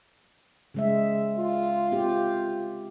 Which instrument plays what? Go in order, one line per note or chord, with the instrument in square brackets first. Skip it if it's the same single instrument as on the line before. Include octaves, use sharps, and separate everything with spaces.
[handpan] C#3 G#3 E5
[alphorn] F4
[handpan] C4 G4